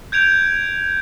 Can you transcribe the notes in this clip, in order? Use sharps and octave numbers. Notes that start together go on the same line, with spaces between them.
G6 G#6 D7 F7